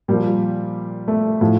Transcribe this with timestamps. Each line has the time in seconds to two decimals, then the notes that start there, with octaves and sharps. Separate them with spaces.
0.08 A#2 F3 G3
1.08 A3
1.41 A2 F3